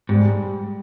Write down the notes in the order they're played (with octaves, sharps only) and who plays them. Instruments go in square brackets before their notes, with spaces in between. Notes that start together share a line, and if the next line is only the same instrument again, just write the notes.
[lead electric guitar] G#2 [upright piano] G3